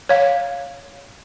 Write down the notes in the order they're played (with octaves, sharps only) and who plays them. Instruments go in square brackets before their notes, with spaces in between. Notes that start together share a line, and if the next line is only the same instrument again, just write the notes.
[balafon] C#5 F5